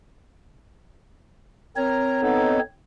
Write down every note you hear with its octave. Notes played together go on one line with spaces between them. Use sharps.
C4 A#4 C#5 A#5
B3 D#4 A4